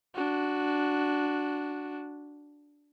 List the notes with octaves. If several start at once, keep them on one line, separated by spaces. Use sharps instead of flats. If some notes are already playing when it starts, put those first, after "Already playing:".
D4 F#4